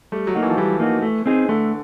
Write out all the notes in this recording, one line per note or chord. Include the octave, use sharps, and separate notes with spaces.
G3 A3
F#3
A#3 D#4 F#4
E3
F3
E3 G3
A#3 D#4 F#4
A3
C4 D#4 G#4
D3 A3